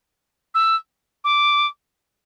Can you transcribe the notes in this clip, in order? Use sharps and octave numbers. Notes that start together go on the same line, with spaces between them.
E6
D6